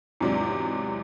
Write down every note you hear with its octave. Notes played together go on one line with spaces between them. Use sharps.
E2 G#2 C3 F#3 D4